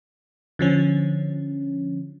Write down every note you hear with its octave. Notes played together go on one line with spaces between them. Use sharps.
D3 F3 C#4